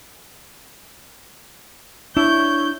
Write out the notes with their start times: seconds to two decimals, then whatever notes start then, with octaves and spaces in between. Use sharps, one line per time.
2.17 D4 E4 C#5 G6